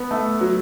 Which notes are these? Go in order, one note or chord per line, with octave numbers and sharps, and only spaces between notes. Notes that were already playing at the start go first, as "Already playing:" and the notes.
Already playing: B3
A3
F#3